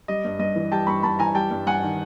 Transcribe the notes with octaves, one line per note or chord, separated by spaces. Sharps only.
G3 D#5
G2
G2 D#5
E3
G3 G5 A5
G2 B5 C#6
G2 A5 B5
E3 G#5 A#5
G3 G5 A5
G2
G2 F#5 G#5
D#3